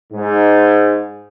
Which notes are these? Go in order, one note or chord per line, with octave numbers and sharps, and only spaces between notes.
G#2